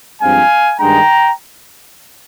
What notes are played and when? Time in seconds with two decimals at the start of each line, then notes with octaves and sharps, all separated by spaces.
0.21 G2 F3 G#3 C4 F5 G#5
0.78 G2 D#3 G#3 D4 G5 A#5